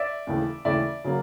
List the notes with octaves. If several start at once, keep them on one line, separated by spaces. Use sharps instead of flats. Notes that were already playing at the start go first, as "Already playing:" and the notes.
Already playing: D5 E5
D#2 C#3 E3 A3
D#2 C#3 E3 A3 D5 E5
C#3 F#3 A#3